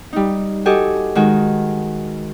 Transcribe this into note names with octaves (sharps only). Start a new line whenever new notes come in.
G3 D#4
F#4 G4 A4 D#5 G#5
D#3 G#3 F#4 G#5